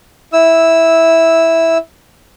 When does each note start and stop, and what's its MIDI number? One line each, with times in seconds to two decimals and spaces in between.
0.33 1.78 64
0.33 1.78 88